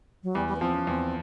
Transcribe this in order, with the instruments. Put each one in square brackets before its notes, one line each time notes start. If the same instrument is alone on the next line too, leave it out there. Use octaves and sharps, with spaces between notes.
[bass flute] F#3
[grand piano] E2 [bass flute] G3
[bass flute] G3
B3
[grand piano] F3 [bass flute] C4
[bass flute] C#4
[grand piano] E2 [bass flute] C4